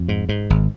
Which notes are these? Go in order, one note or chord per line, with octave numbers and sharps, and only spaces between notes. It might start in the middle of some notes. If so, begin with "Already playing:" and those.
Already playing: F2
G#2
G#2
G#1